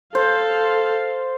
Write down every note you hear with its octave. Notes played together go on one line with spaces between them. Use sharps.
A4 C5 F5